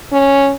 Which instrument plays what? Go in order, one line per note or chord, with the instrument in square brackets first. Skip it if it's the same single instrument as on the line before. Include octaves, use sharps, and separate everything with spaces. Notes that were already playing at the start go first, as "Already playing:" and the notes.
[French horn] C#4